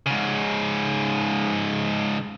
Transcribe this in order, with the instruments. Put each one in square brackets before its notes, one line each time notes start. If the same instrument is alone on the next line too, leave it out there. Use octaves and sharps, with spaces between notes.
[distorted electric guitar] G#2 C#3